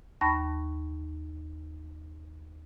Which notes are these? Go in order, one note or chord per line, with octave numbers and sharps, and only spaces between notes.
D#2 A5 B5 C#6 A#6